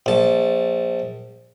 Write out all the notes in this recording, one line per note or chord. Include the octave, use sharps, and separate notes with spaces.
A#1 A5